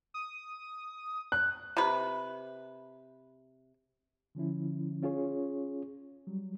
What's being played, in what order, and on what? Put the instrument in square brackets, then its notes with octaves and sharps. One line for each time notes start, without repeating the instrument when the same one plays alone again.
[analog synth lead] D#6
[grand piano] F#6
[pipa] C3 B4
[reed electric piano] D3 F3 C#4 E4
C#4 F4 G#4 C#5
F#3 G3